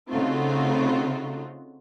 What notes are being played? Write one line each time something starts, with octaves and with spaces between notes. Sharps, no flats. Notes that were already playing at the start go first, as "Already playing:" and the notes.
C#3 A3 C4 D#4 F4 F#4